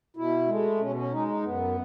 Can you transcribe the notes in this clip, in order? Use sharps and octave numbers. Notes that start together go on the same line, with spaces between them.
B2 E4
G#3 A3
B2 C#4
C#4
G#3 D#4
D#4
F#2 B3